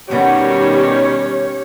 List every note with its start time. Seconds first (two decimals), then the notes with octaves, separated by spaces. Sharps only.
0.11 B2 D#3 G3 B3 C#4 G4 C#5